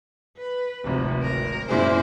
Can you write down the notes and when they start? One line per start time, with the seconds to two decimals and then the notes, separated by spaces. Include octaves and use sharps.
0.38 B4
0.84 D1 G#1 C3 F3
1.23 A#4
1.69 F#2 A#2 E4 G#4 C5